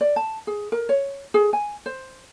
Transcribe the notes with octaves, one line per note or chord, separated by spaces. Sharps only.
D5
A5
G#4
A#4
C#5
G#4
G#5
C5